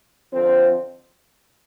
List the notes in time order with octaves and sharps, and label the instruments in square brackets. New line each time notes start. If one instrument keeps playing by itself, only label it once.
[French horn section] F2 D3 F3 C4